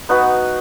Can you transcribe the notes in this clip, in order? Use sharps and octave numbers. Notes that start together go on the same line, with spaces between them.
B3 D#4 F#4 B4